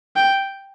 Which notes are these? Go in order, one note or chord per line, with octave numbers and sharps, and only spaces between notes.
G5